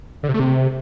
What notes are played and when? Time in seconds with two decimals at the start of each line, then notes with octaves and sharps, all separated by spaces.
0.23 D3
0.29 C3
0.34 A3
0.40 C3